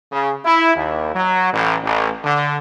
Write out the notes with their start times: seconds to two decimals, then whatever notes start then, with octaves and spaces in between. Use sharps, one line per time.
0.11 C#3
0.45 E4
0.76 D#2
1.14 F#3
1.52 A1
1.84 A1
2.24 D3